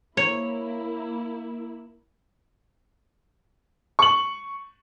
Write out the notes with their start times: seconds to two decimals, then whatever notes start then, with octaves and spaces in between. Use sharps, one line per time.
0.17 A#3 E4 C#5
3.99 C#6 F#7